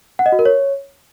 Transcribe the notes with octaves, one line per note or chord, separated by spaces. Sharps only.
F#5
D#5
F#4
A#4
C#5